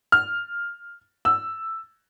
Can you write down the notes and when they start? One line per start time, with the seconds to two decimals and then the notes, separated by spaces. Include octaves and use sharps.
0.12 F6
1.25 E6